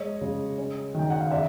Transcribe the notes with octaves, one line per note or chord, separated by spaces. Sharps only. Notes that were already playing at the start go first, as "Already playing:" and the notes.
Already playing: G#3 C#5 D#5
C#3
C#4
D#3 G5
F#5
F5
C#3 D5 E5